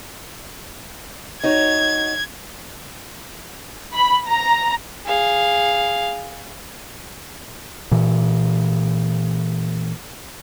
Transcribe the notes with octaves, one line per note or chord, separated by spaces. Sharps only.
D#4 F#4 C#5 G#6
B5
A#5
G#4 F5
A#2 E3